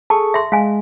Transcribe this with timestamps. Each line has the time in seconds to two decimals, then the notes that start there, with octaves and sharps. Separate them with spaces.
0.10 G#4 A4 A5 C#6
0.34 E5 C6
0.52 G#3 F5 G#5